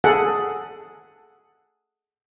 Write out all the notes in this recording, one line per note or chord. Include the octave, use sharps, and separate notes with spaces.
G#4 A4 F#5